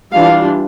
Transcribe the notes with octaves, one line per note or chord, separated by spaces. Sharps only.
E3 G3 D4 F4 F5